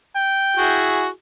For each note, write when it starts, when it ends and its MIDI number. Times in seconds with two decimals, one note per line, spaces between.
0.15 0.88 79
0.57 1.08 64
0.57 1.08 66
0.57 1.08 68